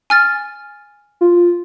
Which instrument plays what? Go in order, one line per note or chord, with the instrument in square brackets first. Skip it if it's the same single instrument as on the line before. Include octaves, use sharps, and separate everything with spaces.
[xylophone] G#5 F6 A6
[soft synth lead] F4